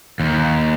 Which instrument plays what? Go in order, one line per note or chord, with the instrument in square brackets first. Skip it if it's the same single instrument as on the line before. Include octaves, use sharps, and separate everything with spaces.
[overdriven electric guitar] D#2